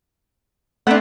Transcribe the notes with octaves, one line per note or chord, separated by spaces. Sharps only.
A3 B3 C4 D4 F#5